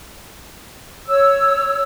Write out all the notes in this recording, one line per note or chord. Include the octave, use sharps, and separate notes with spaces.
C#5 E6